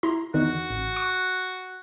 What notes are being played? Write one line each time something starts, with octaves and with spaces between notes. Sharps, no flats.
E4 A#5 C6
E2 D3 D#3 F#4
A1
C#6